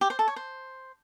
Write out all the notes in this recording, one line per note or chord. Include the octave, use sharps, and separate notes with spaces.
G4
C5
A4
C#5
C5